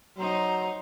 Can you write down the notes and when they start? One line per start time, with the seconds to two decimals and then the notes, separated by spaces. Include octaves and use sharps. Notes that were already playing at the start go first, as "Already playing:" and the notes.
0.18 F#3 D#4 C5 A#5